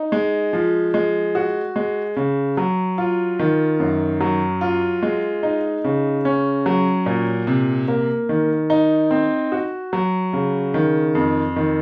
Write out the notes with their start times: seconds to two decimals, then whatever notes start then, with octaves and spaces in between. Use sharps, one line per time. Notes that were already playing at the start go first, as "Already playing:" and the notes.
Already playing: D#4
0.12 G#3
0.53 F3
0.94 G#3
1.35 F#4
1.76 G#3
2.16 C#3
2.57 F#3
2.98 F4
3.39 D#3
3.80 F#2
4.20 F#3
4.61 F4
5.02 G#3
5.43 D#4
5.84 C#3
6.25 C#4
6.66 F#3
7.06 A#2
7.47 C3
7.88 A#3
8.29 D#3
8.70 D#4
9.11 C4
9.52 F#4
9.93 F#3
10.33 C#3
10.74 D#3
11.15 F2
11.56 D#3